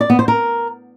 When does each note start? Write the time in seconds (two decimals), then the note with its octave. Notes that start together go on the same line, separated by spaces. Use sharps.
0.01 D5
0.10 B3
0.19 C5
0.28 A#4